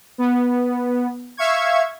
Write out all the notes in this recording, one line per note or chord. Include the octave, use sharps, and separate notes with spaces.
B3
E5 F5 C#6 G#6